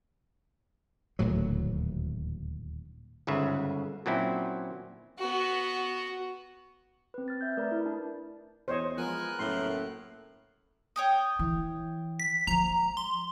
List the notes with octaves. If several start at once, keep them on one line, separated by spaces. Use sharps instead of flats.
D#1 D2 A2 F#3
G1 G#2 C#3 B4 E5
A#2 F#3 C4 C#4 E4
B3 F#4
C4 B4
F6 A6
E5 G6
A3 A#4 B4 D5
E4
D4
E2 C5 C#5 D#5
F3 G#3 B3 A#4 G#5 F#6
F#1 A2 C6
C#5 G5 D#6
E3
B6
F3 G#3 A#5
C6